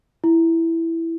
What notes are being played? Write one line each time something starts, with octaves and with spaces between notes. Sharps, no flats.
E4